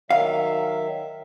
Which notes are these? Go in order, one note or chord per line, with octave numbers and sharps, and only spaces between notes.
D#3 F#3 E5 F5